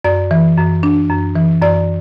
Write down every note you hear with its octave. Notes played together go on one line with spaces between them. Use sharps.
F#2 D5
E3
F#2
D4
F#2
E3
F#2 D5